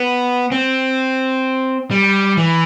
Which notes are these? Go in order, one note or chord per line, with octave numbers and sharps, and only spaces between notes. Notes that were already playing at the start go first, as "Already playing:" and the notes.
Already playing: B3
C4
G3
E3